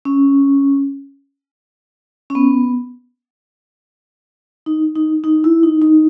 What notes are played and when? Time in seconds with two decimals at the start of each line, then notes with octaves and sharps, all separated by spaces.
0.05 C#4
2.30 C#4
2.35 B3
4.66 D#4
4.95 D#4
5.24 D#4
5.44 E4
5.63 D#4
5.82 D#4